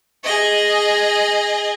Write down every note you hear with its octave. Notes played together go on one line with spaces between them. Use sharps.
G#4 D#5